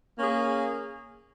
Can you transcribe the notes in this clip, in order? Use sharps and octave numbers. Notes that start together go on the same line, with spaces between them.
A#3 C#4 G#4